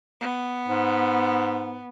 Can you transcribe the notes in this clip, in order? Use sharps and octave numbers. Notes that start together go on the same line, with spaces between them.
B3
G#2